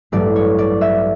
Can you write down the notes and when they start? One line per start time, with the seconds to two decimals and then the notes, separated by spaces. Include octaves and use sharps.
0.12 A1 G2 F#3 A3 D5
0.36 C#5
0.58 D5
0.81 E5